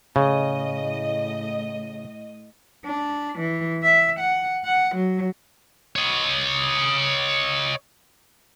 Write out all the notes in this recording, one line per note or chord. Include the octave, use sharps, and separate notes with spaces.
A2 C#3 D#5
D4
E3
E5
F#5
F#5
F#3
C#5 D#5